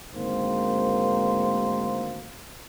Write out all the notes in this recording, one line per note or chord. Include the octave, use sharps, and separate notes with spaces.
D2 G#2 D#3 A#3 C4 C5